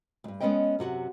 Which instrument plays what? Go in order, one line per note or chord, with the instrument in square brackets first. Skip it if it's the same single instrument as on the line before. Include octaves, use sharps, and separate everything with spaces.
[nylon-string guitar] D2 G2
G#3 B3 C#4 B4 D#5 G5
F#2 C3 F#4 F#5